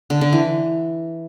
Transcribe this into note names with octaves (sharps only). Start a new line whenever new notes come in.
D3
D3
E3